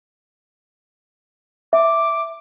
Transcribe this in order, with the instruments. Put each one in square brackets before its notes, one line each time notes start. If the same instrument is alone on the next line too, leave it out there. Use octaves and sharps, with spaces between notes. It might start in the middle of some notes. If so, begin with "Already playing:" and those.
[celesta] E5 [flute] D6